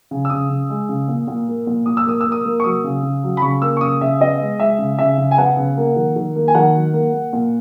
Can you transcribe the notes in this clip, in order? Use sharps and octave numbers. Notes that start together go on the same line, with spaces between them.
C#3
E6
C#3 D#6
C#3
G#3
C#3
A#2
A#2
A#3
A#2
A#2 D#6
E6
A#3 D#6
E6
A#3
D#6
A#3
C#6
F#3 D#6
C#3
C#3
F#3
B5
C#3 C#6
A#3 E6
C#6
C#3 D#6
C#3 E5
B3 D#5
G#3
G#3 E5
C#3
C#3 E5
C#3
G#5
B3 F#5
C#3
A#3
D#3
D#3
A#3
G#5
D#3 F#5
F#3
A#3
A#3
A#2